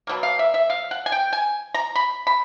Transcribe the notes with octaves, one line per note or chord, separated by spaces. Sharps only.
B2 F#3 A#3
F5
E5
E5
F5
F#5
G#5
G5
G#5
A#5
B5
B5